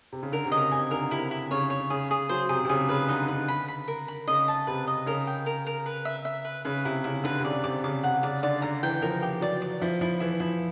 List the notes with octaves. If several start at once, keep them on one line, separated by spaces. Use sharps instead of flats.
C3
C#3
D3 A#4
C3
C#3 D#5
C3 G#5
D3 A#4
C3 E4
E4
C#3 C#5
C#5
C#3 G#4
G#4
F#3 C5
C3 G#4
C3
C#3 G#4
C#3 B4
D3 D#4
D3 B4
B5
B5
A#4
B5
C#3 D#5
A5
C3 B4
D#5
C#3 A#4
G5
A#4
A#4
B4
E5
E5
B4
C#3 B4
C3 E4
C#3 E4
D3 B4
C3
C#3 D5
C3 D6
C#3 D6
C3 F#5
C#3 D5
D3 D5
D3 A#5
E3 G5
F3 A#4
G4
F#3 D5
D5
F3 E4
F3 E4
E3 E4
F3 E4